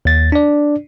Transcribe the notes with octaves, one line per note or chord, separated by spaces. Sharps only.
D#2 A6
D4 D5